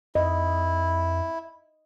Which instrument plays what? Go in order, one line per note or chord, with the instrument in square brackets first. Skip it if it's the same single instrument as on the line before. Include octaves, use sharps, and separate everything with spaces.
[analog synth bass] F2 [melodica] E4 [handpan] D#5